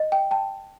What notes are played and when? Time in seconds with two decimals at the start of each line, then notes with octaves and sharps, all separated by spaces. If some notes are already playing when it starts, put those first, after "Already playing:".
Already playing: D#5
0.12 G5
0.31 G5 A5